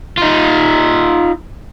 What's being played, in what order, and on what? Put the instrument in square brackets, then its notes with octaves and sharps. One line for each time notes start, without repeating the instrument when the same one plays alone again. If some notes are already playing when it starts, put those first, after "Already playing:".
[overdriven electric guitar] D#4 F4